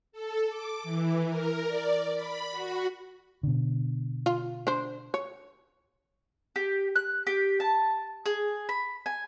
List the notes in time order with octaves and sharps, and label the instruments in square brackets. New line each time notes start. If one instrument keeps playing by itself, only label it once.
[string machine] A4
D6
E3
A#4
D5
B5
F#4
[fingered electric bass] B2 D3
[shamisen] F4
D4 C5
C#5
[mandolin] G4
F#6
G4
A5
G#4
B5
G#5